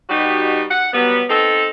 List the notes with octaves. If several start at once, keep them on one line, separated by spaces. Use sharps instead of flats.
B2 G3 D#4 F#4 G4
F#5
F#3 G3 B3
C4 D#4 A4